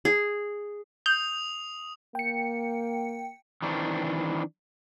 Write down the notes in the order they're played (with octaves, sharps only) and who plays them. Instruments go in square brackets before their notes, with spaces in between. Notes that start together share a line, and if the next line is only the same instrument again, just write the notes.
[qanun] G#4
[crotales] D#6 F7 [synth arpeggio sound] G6
[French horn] A#3 [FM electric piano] G5 C#7
[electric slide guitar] D#3 E3 C4 D4